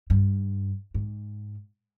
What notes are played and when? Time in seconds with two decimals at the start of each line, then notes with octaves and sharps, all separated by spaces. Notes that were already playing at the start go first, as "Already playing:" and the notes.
0.10 G2
0.94 G#2